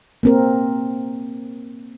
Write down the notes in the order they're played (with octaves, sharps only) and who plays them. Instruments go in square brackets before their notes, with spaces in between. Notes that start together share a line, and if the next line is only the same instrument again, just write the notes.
[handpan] A#3 C4 A#4